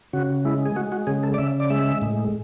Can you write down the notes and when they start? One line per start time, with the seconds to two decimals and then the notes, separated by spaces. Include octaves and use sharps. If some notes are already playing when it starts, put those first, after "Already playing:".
0.13 C#3 F#4
0.45 G#3 E4
0.66 G#4
0.76 G#3 F#4
0.92 F#4
1.07 C#3 G#4
1.23 A4
1.34 D5
1.38 C#3 E5
1.60 D5
1.70 G#3 E5
2.02 A2